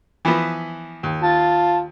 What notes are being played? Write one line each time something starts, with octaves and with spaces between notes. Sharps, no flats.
E3 F3 B3
D#2
F4 A5